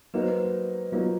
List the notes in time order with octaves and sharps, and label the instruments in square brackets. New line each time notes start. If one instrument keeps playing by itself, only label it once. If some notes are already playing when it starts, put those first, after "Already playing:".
[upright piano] F#3 A#3 D#4 F#4 [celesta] B4
[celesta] C5
B4
[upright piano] F#3 A#3 D#4 F#4 [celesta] F4